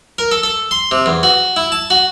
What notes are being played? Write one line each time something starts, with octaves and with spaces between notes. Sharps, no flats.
A#4
A4
A4
C6
C3
E2
F#4
E4
A5
F#4